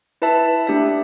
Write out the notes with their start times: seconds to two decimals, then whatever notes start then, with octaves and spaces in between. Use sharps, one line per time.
0.22 E4 B4 E5 A5
0.67 A3 D4 G4 E5